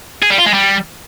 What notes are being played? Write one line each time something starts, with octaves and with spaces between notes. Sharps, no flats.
G#4
G3
F4
G#3
G3